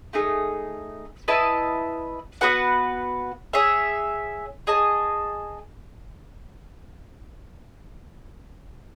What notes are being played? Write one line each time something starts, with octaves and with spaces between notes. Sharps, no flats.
A3 D#4 G#4
E4 B4 D#5 A5
B3 F#4 B4 F#5
G#4 C#5 E5
G#4 D#5 A5